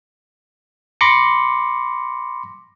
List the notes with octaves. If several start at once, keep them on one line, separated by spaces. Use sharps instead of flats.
B5 C6 D6 A#6 C#7